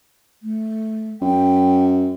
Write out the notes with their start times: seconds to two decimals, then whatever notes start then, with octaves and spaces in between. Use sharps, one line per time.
0.43 A3
1.21 F#2 G5